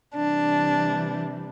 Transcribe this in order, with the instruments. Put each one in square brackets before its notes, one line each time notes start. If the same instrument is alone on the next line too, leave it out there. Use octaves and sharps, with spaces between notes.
[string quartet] C3 E3 G3 D4